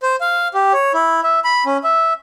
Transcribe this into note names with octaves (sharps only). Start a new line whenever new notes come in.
C5
F5
G4
C#5
E4
E5
B5
C#4
E5